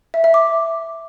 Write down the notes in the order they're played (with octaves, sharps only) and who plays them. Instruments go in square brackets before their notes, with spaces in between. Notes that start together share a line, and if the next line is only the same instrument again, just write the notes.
[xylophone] E5
E5
D6